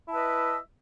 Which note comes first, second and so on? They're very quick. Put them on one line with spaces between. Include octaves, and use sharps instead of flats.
E4 A5 E5 B4 D#5